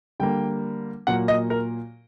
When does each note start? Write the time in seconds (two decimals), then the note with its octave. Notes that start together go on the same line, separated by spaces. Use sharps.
0.20 D3 G3 A#3 G5
1.07 A#2 F#3 A#3 F#5
1.28 D#5
1.50 A#4